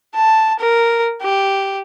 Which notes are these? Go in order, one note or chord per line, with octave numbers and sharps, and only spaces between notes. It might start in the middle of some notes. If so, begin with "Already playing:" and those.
A5
A#4
G4